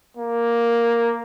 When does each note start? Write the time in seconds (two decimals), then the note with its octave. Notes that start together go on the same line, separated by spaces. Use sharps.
0.17 A#3